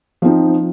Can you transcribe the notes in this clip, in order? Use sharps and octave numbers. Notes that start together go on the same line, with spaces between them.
F3 C4 D#4